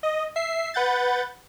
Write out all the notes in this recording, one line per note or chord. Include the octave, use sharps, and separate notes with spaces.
D#5
E5 C7
B4 F#5 G6 A6